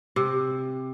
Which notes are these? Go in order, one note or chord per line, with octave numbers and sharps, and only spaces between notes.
C3